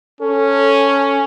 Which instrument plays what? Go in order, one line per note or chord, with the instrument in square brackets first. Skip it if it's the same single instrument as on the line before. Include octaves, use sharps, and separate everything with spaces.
[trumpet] C#4 [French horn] A4